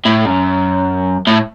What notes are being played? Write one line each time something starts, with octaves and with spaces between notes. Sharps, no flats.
A2
F#2
A2